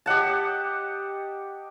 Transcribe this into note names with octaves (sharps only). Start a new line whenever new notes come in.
G4 D#5 F#5 A5